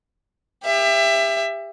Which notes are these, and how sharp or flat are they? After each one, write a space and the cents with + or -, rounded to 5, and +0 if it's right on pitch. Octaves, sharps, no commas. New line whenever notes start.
G4 +30 E5 +20